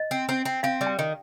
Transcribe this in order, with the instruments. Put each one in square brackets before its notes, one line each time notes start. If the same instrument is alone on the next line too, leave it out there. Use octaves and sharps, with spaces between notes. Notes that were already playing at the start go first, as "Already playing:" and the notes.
Already playing: [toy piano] D#5
[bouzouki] C4
C4
C4
[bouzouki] C4 [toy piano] F5
[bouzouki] G3
[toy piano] G5
[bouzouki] D#3